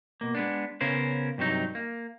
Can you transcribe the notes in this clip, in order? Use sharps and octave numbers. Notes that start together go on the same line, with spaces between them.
B2 A#3
G#3 B3 D4
C#3 B3 C#4 A#4 C5
G2 C3 F#3 D#4
A#3